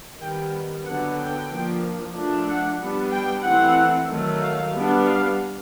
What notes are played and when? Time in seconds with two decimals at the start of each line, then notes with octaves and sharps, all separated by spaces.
0.20 D#3 G3 B3 G5
0.85 D3 F#3 B3 D4 F#5
1.18 G5
1.50 F3 A#3 D4
2.15 F3 A3 D4
2.47 F#5
2.80 G3 B3 D4
3.12 G5
3.44 E3 A3 C4 F#5
4.10 D#3 F#3 A3
4.41 F5
4.74 G3 B3 D4
5.06 F5